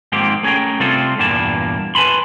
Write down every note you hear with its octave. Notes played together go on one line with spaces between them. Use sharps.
G#2 D#3 F3 A#3 C4 G4
A3 C#4 G#4 A#4 G5
C3 G3 C4 F4 A4 C5
E2 G2 A#2 G3 A#3 A5
B4 G#5 A5 B5 C6